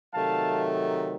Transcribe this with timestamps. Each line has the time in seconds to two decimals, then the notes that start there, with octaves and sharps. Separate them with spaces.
0.13 C3 D#3 F#3 A3 F5 A5